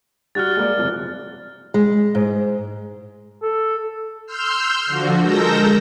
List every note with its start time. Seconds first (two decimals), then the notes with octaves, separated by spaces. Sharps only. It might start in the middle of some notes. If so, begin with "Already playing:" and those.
0.35 G3 F#4 F6 F#6 A6
0.57 G#3 A#3 D5
0.78 F#1 F2 C3
1.74 G#3
2.15 G#2
3.43 A4
4.27 C6 E6 F6 G6
4.86 D3 F3 F#4
5.22 G#3 A4 A#4 E6 G6 A#6